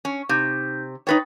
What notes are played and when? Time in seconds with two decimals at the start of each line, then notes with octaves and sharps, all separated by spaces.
0.05 C#4
0.29 C3 D#4 G6
1.07 D#4 B4 C#5 G5 A6